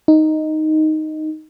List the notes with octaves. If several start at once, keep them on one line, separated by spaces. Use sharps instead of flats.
D#4